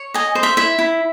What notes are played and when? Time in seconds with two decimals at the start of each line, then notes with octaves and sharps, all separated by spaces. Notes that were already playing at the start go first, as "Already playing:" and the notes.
Already playing: C#5
0.14 D#5 G#5
0.35 C5
0.43 E5
0.57 E4 E5
0.79 E4